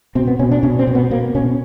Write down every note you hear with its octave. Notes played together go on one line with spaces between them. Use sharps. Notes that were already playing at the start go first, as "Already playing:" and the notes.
B2 C4
B3
B2 C#4
D4
B2 C#4
C4
B2
B3
B2 A#3
B2 C#4